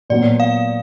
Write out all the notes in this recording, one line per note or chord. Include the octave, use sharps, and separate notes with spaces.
A#2 F#3 B3 D5
F5